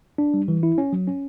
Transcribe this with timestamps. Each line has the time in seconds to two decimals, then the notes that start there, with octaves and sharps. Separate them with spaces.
0.18 D4
0.34 G3
0.48 E3
0.63 E4
0.78 C#4
0.93 F#3
1.07 C#4